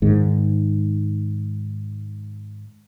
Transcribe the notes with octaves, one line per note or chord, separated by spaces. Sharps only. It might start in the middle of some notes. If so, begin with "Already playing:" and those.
G#2 D#3